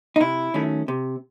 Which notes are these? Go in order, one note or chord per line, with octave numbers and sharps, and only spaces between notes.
D#4
C3 E4
D#3 F#3 A3 C#4
C3